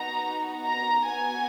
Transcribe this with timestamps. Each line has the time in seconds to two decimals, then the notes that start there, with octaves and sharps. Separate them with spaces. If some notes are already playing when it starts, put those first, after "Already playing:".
Already playing: B3 D#4 F#4 A#5
0.67 A#5
1.06 B3 F#4 G#5